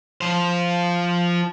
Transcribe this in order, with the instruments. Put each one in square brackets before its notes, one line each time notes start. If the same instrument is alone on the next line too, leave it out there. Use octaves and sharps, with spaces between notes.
[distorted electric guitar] F3 C5